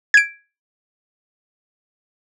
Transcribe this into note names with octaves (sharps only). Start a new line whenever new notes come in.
G#6 D7